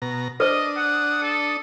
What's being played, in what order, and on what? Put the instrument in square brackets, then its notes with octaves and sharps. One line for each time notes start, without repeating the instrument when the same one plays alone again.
[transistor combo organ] B2 A#5
[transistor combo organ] D4 D#6 [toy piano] B4 C5 [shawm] D#5
[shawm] F#5
A4